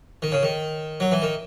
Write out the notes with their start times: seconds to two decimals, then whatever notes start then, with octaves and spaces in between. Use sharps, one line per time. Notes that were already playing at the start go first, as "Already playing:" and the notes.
0.22 D#3
0.32 C#3
0.43 D#3
1.00 F#3
1.12 E3
1.22 D#3